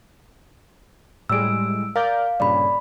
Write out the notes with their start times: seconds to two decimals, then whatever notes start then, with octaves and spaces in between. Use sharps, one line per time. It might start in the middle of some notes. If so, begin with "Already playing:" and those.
1.29 A2 G3 G#3 E6 D7
1.96 A#4 D5 F5 G6
2.40 G2 A#2 C#3 D5 B5